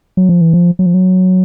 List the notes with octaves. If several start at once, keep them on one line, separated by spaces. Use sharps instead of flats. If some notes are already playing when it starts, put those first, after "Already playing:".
F#3
F3
E3
F3
F#3
F3
F#3